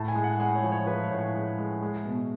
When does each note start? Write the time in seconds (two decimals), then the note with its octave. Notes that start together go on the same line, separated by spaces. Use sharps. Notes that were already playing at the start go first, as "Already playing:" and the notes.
Already playing: A2 A5
0.08 G#5
0.15 G#3
0.24 F#5
0.40 G#3 G#5
0.55 C#5
0.64 F3
0.72 C#5
0.86 F3 B4
1.03 C#5
1.11 A2
1.18 C#5
1.35 G#3
1.58 G#3
1.82 G#3
2.05 B2